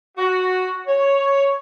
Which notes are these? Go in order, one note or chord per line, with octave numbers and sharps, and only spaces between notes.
F#4
C#5